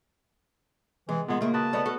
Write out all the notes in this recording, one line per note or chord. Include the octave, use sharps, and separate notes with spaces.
C3 E3 G#3
A#2 G#3 B3
C#3 A3 A#3 A#4
F#4 B4 D#5 A5
A3 B3 C#4 D5 D#5
F#4 A4